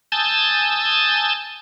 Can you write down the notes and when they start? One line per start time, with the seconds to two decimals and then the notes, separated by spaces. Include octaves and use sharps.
0.12 G#5 A5 D#6 E6 G6 A6